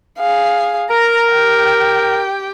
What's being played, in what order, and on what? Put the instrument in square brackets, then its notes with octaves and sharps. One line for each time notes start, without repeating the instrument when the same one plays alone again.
[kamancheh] G#4 F5
[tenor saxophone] A#4 [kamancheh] A#5
[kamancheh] G4 G5